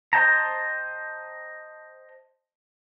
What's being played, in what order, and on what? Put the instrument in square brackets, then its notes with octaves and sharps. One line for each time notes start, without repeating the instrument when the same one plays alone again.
[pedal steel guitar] C5 D#5 G5 A5 A#5